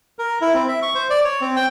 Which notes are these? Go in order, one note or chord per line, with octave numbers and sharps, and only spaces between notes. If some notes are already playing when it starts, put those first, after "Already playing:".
A#4
E4
C4
E5
C#6
C5
D5
C#5
C4
G5